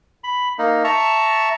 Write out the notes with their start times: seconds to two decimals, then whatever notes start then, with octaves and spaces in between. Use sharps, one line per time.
0.24 B5
0.59 A#3 D#4
0.84 E5 A5 A#5 C#6